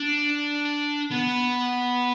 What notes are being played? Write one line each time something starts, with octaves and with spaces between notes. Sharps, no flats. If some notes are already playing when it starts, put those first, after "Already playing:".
Already playing: D4
B3